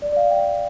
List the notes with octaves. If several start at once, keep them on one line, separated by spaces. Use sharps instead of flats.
D5
D5
F5
G5